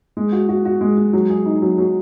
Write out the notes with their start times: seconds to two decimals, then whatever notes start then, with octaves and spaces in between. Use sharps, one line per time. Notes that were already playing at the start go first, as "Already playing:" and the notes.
0.17 G#3
0.32 F#4
0.49 F#4
0.65 F#4
0.81 G#3
0.98 G#3
1.13 F#3
1.30 G#4
1.45 D#4
1.62 F#3
1.78 F#3